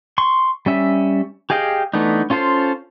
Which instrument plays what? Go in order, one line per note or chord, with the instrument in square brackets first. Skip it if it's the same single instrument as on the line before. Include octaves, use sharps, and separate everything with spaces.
[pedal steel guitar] C6 C#6
G3 C#4 E5
G4 G#4 D#5 F5 G5
E3 A3 B3 D4 D#4
C#4 F4 A4 C5 F5